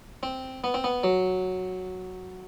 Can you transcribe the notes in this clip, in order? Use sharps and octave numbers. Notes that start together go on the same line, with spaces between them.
C4
B3
C4
B3
F#3